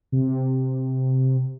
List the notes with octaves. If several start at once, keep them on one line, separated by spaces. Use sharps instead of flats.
C3